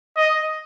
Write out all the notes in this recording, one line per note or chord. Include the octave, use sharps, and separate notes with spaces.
D#5